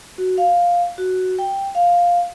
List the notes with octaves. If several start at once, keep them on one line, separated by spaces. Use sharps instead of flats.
F#4
F5
F#4
G5
F5